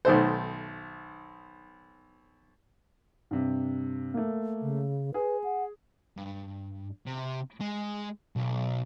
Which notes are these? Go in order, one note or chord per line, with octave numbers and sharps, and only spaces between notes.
B1 D#3 A3 C5
G2 C3
A3 A#3
C#3
G#4 B4
F#5
G2
C3
G#3
B1